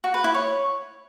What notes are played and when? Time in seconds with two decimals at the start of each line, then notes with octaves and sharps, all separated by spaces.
0.04 F#4
0.14 B4
0.24 E4
0.34 C#5